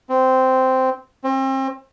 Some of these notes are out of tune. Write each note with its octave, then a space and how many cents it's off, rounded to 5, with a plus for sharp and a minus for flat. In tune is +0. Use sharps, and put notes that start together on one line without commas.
C4 -10
C4 +35